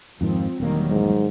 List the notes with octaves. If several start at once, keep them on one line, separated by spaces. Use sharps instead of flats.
F2 G#2 D#3 F3 C4
E1 D#3 F#3 G3 A#3
G#2